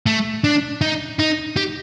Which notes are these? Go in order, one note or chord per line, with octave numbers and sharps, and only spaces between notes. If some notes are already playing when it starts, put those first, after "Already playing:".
A3
D4
D#4
D#4
G4